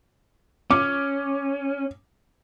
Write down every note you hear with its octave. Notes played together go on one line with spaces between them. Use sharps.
C#4 D6